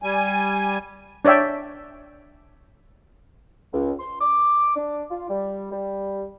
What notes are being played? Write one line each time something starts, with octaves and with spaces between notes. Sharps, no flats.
G3 G#5
D4 C#5 D5 E5 G5
C#2
C6
D6
D4
F4
G3
G3